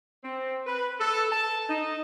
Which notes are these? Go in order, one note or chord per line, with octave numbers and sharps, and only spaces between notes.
C4
B4
A4
A5
D#4